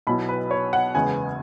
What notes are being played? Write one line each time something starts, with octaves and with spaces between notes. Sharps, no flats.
B1 B2 F#3 E4 B5
B4
C#5
F#5
F#1 E2 C#3 G#3 B3 G#5